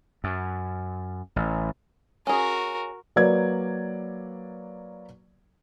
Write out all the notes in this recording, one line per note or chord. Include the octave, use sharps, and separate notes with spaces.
F#2
A1
C#4 F#4 G#4 A#4
F#3 A#3 B4 D5 G#6